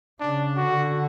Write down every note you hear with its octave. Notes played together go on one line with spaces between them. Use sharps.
C#3 D4
D3 F#4